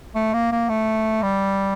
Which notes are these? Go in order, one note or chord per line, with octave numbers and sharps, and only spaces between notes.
A3
A#3
A#3
A3
G3